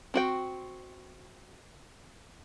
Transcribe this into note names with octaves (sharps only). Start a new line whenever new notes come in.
C4 F#4 G5